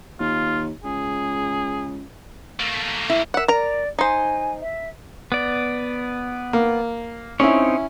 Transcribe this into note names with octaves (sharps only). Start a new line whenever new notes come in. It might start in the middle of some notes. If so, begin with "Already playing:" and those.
D#2 F4
C#2 G#4
A3 A#3
E4
A#4 E5 F#5
A#4 D5 A#5
D#4 C5 G#5
E5
B3 D5
A#3
C4 C#4 D#4 E4 C#5